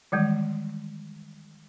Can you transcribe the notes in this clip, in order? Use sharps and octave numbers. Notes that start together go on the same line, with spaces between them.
D#3 E3 G3 G#3